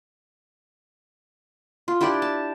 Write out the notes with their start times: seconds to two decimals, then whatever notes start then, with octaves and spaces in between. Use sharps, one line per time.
1.88 F4
2.01 D4 E4 G4 D5
2.22 A5